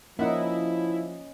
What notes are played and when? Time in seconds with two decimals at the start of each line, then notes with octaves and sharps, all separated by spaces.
0.19 F3 A#3 C#4 D#4 E4 D#5 F#5